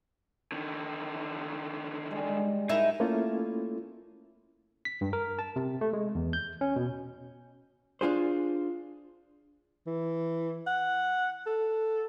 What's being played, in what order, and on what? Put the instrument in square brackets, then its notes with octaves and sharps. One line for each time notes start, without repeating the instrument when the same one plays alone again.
[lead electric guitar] D3 D#3
[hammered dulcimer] G3 G#3
[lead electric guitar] D#4 [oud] E4 A#4 E5
[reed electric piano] A3 A#3 C#4 E4 F4 A4
[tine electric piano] B6
G2
A#4
A5
C3
A3
G#3
E2
G6
C#4
B2
[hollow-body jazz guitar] D4 F4 G#4 C5
[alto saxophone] E3
F#5
A4